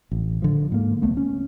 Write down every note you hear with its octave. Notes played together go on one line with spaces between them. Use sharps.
A1
D3 F3
G#2 A#3
C#2 A3 B3
C#4